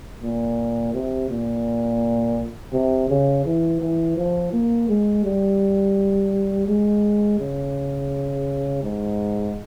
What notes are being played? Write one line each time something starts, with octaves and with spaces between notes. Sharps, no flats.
A#2
C3
A#2
C3
C#3
E3
E3
F3
A#3
G#3
G3
G#3
C#3
G#2